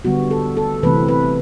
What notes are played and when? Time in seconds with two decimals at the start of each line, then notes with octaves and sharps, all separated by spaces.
0.05 D3 G3 B3 F#4
0.31 A4
0.57 A4
0.83 C3 E3 A3 C4 B4
1.08 B4